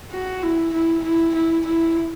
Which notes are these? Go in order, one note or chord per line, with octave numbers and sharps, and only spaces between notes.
F#4
E4
E4
E4
E4
E4